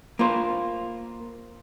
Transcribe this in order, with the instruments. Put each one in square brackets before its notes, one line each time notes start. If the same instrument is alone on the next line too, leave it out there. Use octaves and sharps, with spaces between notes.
[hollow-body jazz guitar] A#3 F4 C5